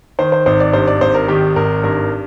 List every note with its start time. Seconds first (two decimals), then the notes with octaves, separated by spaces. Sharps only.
0.19 D#3 C5
0.32 C5
0.46 G#1 C5
0.60 D5
0.73 G2 C5
0.88 D5
1.01 G#1 C5
1.15 A#4
1.28 D#3 G4
1.56 G#1 A#4
1.83 G2 A#4